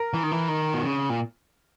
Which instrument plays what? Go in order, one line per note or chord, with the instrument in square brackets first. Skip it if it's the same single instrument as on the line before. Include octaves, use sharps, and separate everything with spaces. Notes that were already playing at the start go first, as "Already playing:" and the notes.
Already playing: [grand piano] A#4
[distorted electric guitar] E3
D#3
E3
D#3
B2
C#3
A#2